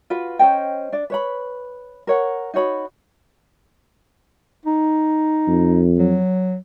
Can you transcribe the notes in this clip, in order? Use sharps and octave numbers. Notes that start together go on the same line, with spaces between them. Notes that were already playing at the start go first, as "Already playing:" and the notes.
F4 F#4 B4
C#4 C5 D#5 G5
D4 D5
B4 C#5 B5
A#4 C#5 F#5
D#4 F#4 C#5 B5
D#4
F2
F#3